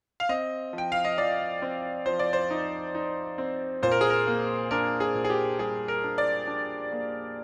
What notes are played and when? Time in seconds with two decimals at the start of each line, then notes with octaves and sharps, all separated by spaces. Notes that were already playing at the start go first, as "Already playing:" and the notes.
0.20 F5
0.29 C4 D#5
0.73 F3
0.78 G5
0.92 F5
1.05 D#5
1.17 F3 D5
1.62 C4
2.06 F3 C5
2.19 D5
2.33 C5
2.50 D#4
2.95 D#4
3.38 C4
3.82 A#2 C5
3.92 A#4
4.01 G#4
4.10 A#4
4.27 A#3
4.71 D4 A#4
5.00 G#4
5.15 A#2
5.24 G#4
5.30 G4
5.59 G3 G#4
5.88 A#4
6.03 D4
6.18 D5
6.47 D4
6.92 A#3